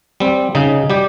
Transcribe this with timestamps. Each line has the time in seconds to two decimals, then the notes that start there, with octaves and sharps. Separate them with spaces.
0.20 G3 C4
0.55 C#3 D#4
0.90 G3 G4